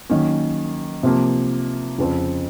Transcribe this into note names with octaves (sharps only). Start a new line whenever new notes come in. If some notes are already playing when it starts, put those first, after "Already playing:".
D#3 F#3 A#3 C#4
C3 F3 A#3
F2 C#3 F3 C4